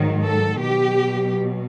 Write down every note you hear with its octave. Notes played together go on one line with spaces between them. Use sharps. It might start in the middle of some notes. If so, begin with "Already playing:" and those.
Already playing: G#2 D#3 F#3
A4
B2 F#3 G4